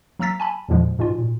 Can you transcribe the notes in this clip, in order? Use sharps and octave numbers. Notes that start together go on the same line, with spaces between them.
F#3 A#3 A#5 E6 A6 B6
G#5 A5 B5
E2 G2 A#2 D3 F3 G#3
G#2 B2 E3 F4
A#2